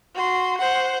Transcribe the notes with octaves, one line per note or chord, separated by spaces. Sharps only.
F#4 C6
C5 F#5